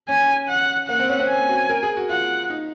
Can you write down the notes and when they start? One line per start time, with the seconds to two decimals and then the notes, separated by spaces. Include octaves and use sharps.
0.09 C#4 G#5
0.49 F#5
0.88 A#3 F#5
0.99 C4
1.09 C#4
1.19 C4
1.29 G#5
1.49 F#4
1.69 A#4
1.83 G#4
1.97 F#4
2.09 F4 F#5
2.50 D#4